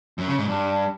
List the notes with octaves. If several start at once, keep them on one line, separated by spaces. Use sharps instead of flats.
F#2
C#3
G#2
G2